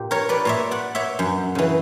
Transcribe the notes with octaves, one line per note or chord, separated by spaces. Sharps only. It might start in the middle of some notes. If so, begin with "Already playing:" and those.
Already playing: A#2 G4
A#4 C#5
B4 D5
A#2 C#5 E5
D5 F#5
C#5 E5
F#2
C#3 E3